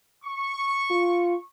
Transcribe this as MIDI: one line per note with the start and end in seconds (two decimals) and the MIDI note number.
0.23 1.41 85
0.91 1.35 65